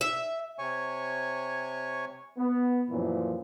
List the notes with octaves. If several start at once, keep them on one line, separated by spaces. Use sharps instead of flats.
E5
C3 C#5 G#5 C#6
B3
F#2 A#2 E3 F3